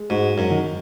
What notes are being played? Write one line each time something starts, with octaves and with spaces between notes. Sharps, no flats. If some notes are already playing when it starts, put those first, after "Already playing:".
Already playing: G#3
G#2 F#4
F#2
D#3